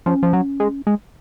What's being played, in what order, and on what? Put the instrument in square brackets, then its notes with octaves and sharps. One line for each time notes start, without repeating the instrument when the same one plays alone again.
[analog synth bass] F3 [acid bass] C#4
[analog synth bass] F3
F#3
G#3
G#3